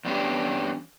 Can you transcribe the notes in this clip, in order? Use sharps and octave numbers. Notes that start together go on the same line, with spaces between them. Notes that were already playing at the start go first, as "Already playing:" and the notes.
E2 G2 B3 C#4 D4 G4